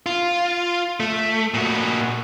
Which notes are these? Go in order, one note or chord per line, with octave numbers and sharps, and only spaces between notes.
F4
A3
A#2 F#4